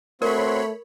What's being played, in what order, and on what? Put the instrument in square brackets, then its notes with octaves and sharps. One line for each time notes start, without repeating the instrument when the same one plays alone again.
[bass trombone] A3 [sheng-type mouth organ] C4 F#4 C6 [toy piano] A#4 [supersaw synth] C#5 B5